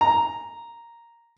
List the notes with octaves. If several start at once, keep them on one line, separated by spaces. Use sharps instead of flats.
A#5